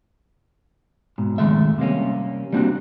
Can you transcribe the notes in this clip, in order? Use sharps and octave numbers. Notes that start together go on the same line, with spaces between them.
G#2 B2
F2 G#2 D#3 G#3 A3 E5
C3 G3 A#3 C#4
G3 A#3 C4 D4 D#4 F#4